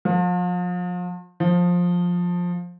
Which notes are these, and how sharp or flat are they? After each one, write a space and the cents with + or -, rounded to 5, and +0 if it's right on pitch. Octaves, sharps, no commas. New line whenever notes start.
F3 +35
F3 +15